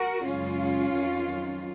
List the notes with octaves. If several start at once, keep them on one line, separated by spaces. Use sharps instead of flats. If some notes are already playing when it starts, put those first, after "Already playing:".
Already playing: F#4 A#4
F#2 C#3 G#3 C#4 F4
F2 D#3 F#3